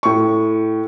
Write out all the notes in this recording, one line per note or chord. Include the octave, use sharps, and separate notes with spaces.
A2 C#6